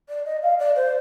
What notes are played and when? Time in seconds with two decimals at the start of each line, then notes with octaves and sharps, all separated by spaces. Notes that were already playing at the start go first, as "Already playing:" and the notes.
0.09 D5
0.26 D#5
0.43 F5
0.59 D5
0.76 C5